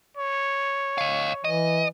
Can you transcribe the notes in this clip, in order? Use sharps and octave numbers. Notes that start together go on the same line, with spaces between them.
C#5
D#5 F5
E3 D#5